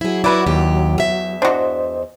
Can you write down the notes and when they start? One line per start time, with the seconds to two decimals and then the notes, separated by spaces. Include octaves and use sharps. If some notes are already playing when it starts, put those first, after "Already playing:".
0.01 F#3 E4 G#4
0.24 E4 F#4 B4 D5
0.46 D#2 G4
0.98 E2 E5
1.42 D4 F#4 C5 D#5